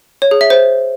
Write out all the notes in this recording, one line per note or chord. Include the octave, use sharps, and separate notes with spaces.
C#5
G#4
E5
C5